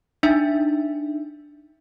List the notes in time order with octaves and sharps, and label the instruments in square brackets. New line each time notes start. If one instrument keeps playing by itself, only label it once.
[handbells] D4 D#4 E5